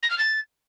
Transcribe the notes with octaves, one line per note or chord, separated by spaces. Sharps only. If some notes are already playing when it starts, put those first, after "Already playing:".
A#6
F6
A6